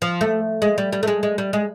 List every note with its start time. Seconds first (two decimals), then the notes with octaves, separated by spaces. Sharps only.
0.02 F3
0.21 A3
0.62 G#3
0.78 G3
0.93 G3
1.03 A3
1.07 G#3
1.23 G#3
1.38 G3
1.53 G#3